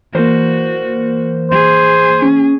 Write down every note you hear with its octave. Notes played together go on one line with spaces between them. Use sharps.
E3 A#3 F#4 A#4 C5
G#4 C5
C#4